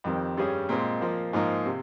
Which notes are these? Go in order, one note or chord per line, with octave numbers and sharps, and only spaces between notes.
F2 D#3 G3 C4 G4
G2 G3 C#4 G#4
A#2 G#3 C4
A#2 F3 A#3
G#2 F3 A#3 D#4
C3